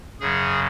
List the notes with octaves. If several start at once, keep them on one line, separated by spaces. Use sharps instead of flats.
F#2 C#3 F#3 G#4